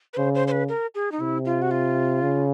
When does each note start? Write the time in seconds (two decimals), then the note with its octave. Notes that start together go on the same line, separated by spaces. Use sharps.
0.14 B4
0.17 C#3 C5
0.35 C5
0.47 C5
0.51 B4
0.69 A#4
0.95 G#4
1.12 D#4
1.20 C3 E4
1.45 F4
1.62 F#4
1.71 F4
2.22 C#3